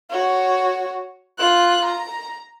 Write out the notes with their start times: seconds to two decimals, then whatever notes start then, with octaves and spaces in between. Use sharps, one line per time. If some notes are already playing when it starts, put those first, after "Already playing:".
0.10 F#4 C#5
1.38 F4 F#6
1.85 A#5